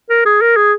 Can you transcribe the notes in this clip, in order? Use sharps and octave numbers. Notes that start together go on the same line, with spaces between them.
A#4
G#4
A#4
G#4